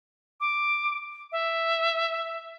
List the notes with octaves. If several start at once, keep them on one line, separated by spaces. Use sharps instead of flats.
D6
E5